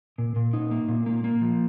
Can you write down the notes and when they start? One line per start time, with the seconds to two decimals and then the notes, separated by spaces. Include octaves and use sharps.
0.18 A#2
0.36 A#2
0.53 D#4
0.71 A#3
0.88 A#2
1.06 A#3
1.24 A#3
1.42 F3